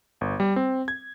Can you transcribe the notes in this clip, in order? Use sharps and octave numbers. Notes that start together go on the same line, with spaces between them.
G1
G3
C4
G#6